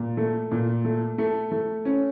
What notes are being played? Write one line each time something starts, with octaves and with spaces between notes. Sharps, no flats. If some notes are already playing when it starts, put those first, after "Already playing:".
Already playing: A#2
A3
A#2
A3
A3
A3
C#4